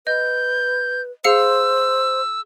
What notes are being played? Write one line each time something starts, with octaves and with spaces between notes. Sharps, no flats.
B4 D#5 G6
G#4 C5 F5 E6 C#7